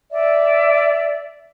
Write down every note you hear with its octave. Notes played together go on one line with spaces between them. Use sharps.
D5 E5